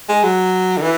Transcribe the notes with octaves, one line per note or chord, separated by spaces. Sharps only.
G#3
F#3
D3
E3